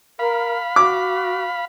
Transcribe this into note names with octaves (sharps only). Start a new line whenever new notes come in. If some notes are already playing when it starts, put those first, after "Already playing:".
A#4 F5 B5
F#4 D6